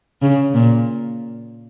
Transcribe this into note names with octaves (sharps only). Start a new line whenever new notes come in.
C#3
A#2